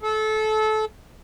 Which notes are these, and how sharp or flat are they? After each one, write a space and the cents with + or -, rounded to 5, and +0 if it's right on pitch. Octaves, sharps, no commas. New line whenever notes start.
A4 -25